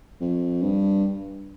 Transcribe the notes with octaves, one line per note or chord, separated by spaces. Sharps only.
F2
G2